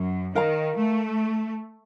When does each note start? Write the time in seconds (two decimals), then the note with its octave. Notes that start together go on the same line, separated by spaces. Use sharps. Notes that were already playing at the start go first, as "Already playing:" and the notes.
Already playing: F#2
0.35 D#3 A#4 F5 A#5
0.76 A3